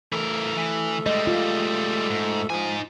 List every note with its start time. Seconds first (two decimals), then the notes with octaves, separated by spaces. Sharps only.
0.13 E3 A3 A#4
0.57 E3
1.06 G3 G#3 D#5
1.27 F4
2.10 G#2
2.50 F3 D#4 G#5